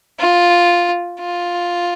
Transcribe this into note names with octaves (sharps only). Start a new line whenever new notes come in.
F4
F4